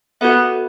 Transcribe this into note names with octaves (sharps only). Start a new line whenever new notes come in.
B3 F#4 A4 E5